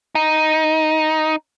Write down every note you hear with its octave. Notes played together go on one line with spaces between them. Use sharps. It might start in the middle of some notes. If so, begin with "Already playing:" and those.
D#4